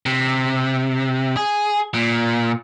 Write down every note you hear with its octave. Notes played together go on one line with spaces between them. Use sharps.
C3
G#4
A#2